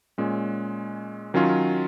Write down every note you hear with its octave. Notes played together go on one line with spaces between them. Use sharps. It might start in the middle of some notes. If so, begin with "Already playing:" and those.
A#2 G#3 C#4
D#3 F#3 C#4 F4